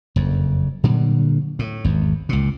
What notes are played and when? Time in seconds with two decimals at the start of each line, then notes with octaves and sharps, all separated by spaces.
0.16 F#1 F2
0.84 A#2 D3 F#3 G3
1.59 A2
1.85 G#1 E2
2.29 C#2 A#2